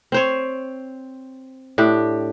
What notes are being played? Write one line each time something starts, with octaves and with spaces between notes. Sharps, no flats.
C4 C5 C#5
A2 D4 G4